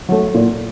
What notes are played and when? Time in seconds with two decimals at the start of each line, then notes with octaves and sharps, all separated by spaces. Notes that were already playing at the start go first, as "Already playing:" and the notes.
0.09 F#3 A3
0.34 A#2